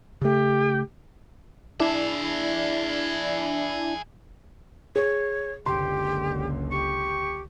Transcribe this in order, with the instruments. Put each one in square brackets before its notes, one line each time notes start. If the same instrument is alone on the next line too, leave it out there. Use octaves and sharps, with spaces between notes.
[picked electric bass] C#3 A3 [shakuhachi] G4
[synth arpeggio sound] D4 E4 [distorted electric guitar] G#4 E5
[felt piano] G#4 [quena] C#5
[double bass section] F#1 C#2 D3 [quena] G4 [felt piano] C6
[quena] G4 [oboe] C#6